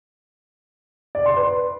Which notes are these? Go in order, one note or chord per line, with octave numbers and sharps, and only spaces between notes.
D5
C6
B4